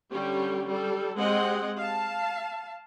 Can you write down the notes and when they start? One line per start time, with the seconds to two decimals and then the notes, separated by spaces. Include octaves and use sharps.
0.11 D3 G3 C#4 G4
0.68 G3 A4
1.18 G#3 C4 G4 D#5 F#5
1.78 F5 A5